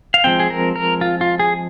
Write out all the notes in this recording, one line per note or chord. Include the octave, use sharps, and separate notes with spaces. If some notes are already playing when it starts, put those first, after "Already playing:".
F5
F3 G#3 C4 G5
G#4
A#4
A#4
F4
F4
G#4